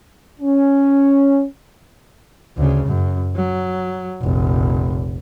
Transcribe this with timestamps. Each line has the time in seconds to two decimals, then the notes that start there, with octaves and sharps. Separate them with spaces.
0.41 C#4
2.57 D2 C#3
2.86 F#2
3.36 F#3
4.21 F1 A#1